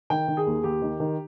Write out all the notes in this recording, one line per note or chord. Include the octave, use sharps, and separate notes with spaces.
D#3 G5
D#3
G#4
D#2
D#2 G4
D#3
D#3